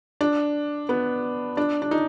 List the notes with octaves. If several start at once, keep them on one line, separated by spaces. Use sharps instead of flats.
D4
B3
D4
D4
D#4